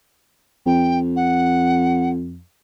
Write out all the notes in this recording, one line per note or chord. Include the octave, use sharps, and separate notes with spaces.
F2 G5
F#5